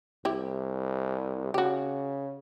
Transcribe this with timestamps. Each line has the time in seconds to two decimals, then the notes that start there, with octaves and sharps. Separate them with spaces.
0.25 C2 E4 G4
1.54 C#3 F#4 G4